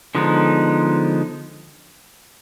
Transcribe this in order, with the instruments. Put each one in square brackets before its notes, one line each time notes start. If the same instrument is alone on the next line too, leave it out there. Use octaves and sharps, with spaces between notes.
[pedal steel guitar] D3 F3 G#3 B3 D#4